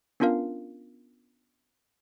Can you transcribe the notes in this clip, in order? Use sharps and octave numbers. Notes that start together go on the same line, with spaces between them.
B3 C#4 D4 F4 A#4 F5